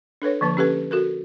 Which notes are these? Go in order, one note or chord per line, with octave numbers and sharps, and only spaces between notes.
D4 A4 B4 C#5
D3 F3 A#3 A5
C#4 G4 A4 B4
F#4 A4 A#4